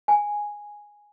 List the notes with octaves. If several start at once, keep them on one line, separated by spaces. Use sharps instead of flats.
G#5